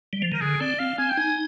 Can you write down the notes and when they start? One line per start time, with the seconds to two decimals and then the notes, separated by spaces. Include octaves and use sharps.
0.13 G3
0.22 F3
0.32 D#3 A#4
0.41 D3 G#4
0.60 C4 D5
0.79 C4 F5
0.98 C4 G#5
1.10 G5
1.17 D#4 G#5